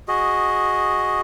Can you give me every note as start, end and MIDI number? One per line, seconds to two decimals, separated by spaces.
0.08 1.21 66
0.08 1.21 68
0.08 1.21 75